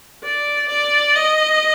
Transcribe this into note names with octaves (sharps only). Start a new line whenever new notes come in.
D5
D5
D#5